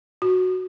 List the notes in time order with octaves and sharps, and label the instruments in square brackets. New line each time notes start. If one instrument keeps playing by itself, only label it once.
[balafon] F#4